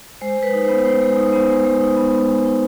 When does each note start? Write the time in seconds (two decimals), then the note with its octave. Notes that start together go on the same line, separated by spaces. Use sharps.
0.21 G#3 C5
0.38 G#3
0.43 B4
0.53 D#4
0.64 B3 C5
0.85 G#3 C5
1.01 G#3
1.17 D#4
1.28 B3 C5
1.48 G#3
1.65 G#3
1.81 D#4
1.96 B3
2.13 G#3
2.29 G#3
2.45 D#4